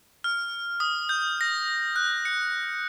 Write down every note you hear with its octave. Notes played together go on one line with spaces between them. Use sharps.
F6
D#6
G6
A#6
F#6
C#7